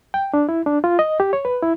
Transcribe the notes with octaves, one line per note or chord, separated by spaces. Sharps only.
G5
D4
E4
D4
F4
D#5
G4
C#5
B4
E4